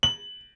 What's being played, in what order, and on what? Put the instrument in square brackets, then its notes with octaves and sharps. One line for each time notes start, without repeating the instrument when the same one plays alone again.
[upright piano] F#7